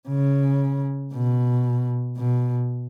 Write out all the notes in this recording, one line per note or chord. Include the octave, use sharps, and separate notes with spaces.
C#3
B2
B2